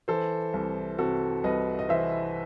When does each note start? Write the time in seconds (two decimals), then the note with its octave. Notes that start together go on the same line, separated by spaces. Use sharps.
0.08 E3 A4 C5
0.54 C2
0.99 C3 F#4 A4
1.44 C2 B4 D#5
1.79 D#5
1.89 E3 C5 E5